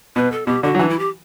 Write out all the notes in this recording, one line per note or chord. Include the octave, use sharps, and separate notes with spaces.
B2 B4
A4
B2 G4
D3 F#4
F#3
E3 D4
E4
G4